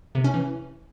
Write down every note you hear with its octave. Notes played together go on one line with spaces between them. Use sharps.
C3
C#4
E3